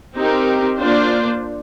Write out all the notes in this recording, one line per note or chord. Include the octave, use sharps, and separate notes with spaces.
C4 D#4 G4 A#4
A#3 D4 F4 C5